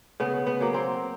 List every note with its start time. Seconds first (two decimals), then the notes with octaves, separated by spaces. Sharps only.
0.20 C#3 B3
0.47 B3
0.60 F#3 A#3
0.74 C4